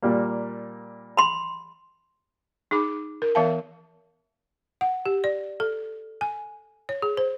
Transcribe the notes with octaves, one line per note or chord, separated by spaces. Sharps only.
A#2 G3 A#3
B5 C6
D#4 G#4 B5 D6
A#4
E3 B3 A#4 E5 F5 A5
F#5
G4
D5
A4
G#5
C#5
G#4
C5